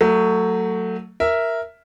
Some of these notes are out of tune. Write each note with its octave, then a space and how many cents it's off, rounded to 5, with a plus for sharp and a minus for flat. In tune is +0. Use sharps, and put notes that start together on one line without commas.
F#3 +0 A3 +20
A#4 +0 E5 +0